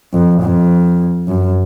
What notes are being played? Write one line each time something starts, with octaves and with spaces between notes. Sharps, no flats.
F2
F2
F#2